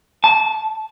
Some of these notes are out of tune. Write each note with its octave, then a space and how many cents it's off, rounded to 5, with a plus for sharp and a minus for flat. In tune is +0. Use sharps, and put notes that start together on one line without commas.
A5 -20